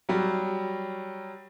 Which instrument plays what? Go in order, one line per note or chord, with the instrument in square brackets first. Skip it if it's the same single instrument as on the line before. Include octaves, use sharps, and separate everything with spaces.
[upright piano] F#3 G3